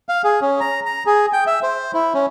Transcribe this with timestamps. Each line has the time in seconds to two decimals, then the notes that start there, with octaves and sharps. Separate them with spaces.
0.09 F5
0.24 G#4
0.41 C#4
0.60 A#5
0.85 A#5
1.06 G#4
1.33 G5
1.47 E5
1.63 C5
1.94 E4
2.14 C#4